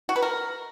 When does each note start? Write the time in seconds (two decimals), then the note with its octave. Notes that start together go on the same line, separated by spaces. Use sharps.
0.09 F#4
0.16 B4
0.22 A#4